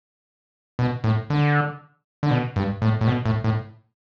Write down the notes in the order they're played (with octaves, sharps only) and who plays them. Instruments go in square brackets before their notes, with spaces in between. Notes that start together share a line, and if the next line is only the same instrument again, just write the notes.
[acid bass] B2
A2
D3
D3
B2
G2
A2
A2
B2
A2
A2